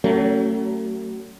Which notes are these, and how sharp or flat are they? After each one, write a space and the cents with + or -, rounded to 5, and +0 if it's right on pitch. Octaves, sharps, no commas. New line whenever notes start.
F#3 +35 A3 +35 C#4 +0